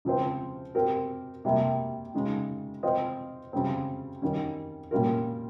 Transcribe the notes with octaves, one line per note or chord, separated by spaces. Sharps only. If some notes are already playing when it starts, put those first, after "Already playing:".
C#3 F3 C4 F4 C5
C4 G4 A#4
C3 G3 A#3
C#3 G#3 D#4
C4 F4 C5 D#5
C#3 G3 C4
D#3 G3 C#4
A#2 G3 C#4 F4 A#4